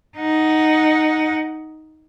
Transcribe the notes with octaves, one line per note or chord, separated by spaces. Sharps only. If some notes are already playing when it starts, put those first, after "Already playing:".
D#4 F#5